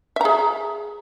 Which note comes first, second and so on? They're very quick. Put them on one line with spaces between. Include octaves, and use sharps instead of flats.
E5 A#5 G#4